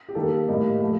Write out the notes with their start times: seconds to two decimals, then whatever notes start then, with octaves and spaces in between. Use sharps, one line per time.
0.08 G4
0.15 D#3 G3 A#3 A4
0.48 A2 G3 A#3 D#5
0.81 F3 A3